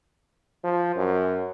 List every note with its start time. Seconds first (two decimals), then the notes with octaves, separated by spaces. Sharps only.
0.64 F3
0.96 F#2